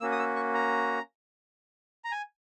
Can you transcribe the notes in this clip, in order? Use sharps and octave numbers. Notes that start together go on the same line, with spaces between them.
A#3 C#4 F#4 E6
D#6
E6
C#6
A#5
A#5
G#5